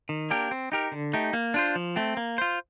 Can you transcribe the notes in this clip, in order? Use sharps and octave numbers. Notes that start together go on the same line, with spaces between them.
D#3
A#3 D4 G4 A#4
C4
D#4 G4 A#4
D3
A3 D#4 G4
A#3
D4 F4 C5
F3
A3 C4
A#3
F4 C5